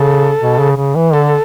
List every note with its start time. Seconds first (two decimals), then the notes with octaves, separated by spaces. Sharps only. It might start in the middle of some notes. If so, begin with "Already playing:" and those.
Already playing: C#3 A4
0.40 B2
0.58 C#3
0.76 C#3
0.95 E3
1.13 D3 A4